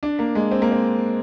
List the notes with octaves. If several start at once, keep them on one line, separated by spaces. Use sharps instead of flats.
D4
A#3
G#3
C4
A#3
C4